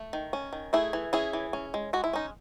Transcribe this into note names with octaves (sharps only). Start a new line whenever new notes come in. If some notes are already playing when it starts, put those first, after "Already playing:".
Already playing: A3
D#3
C#4
D#3
A3 E4 G#4
E3
C#4 E4 G#4
E3
C#4
G#3
G#3 F#4
E4
C#4 D#4